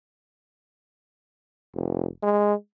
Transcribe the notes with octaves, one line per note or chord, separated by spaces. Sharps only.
F1
G#3